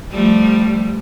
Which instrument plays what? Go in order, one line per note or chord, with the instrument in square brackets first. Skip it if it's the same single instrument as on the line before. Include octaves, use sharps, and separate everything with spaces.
[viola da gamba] F3 G3 A3